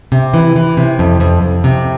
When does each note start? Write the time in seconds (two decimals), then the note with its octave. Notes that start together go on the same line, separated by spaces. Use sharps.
0.12 C3
0.34 E3
0.56 E3
0.77 C3
0.99 F2
1.20 F2
1.42 F2
1.64 C3